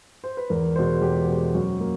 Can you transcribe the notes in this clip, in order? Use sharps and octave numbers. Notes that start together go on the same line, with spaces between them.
C5
B4
E2 A#4
B2 G#3 C5
E2 G4
B2 G#3
F#2 F#4
A#3